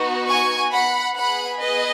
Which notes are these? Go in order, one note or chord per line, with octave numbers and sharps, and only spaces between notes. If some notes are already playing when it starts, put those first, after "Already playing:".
Already playing: B3 D#4 F#4
G#5 C#6
F#5 B5
B3 G#4 F#5 B5
B4 D#5